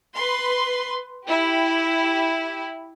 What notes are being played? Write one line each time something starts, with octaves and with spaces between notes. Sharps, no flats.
B4 C6
E4 G4